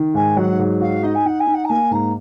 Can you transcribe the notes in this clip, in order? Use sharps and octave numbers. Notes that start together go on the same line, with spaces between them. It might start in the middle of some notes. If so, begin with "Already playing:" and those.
Already playing: D#3
G#2 G#5
F#3 F#5
G#2
F#4 F5
D#4 D#5
G#5
D#4 F#5
G#5
D#4
F#5
A#5
A#3 G#5
G#2 A#5